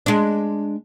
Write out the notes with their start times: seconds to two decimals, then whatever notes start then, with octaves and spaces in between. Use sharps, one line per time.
0.06 G#3 D4